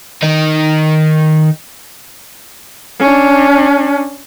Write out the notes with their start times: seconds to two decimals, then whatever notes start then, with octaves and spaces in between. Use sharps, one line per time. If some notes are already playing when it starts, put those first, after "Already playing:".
0.23 D#3 D#4
3.00 C#4 D4